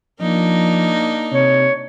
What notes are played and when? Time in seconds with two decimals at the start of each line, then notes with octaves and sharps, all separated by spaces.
0.21 F3 A#3 D4 D#4
1.32 C3 C#5